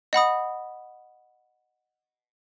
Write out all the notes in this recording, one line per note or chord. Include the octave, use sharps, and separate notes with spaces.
D#5 F#5 B5 D#6